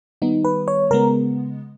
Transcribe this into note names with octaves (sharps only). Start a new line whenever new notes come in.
D#3 G3 B3 D#4
B4
C#5
C#3 G#3 B3 A#4